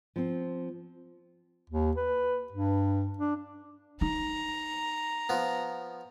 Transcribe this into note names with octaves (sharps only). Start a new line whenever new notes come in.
F3 C4
D#2
B4
G2
D4
D#4 A#5
F3 B3